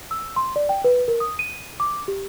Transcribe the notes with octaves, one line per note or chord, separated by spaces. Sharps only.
E6
C6
D5
G5
B4
A#4
D#6
D#7
D6
G4